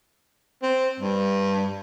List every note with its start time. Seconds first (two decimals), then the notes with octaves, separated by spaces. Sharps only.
0.63 C4
1.00 G2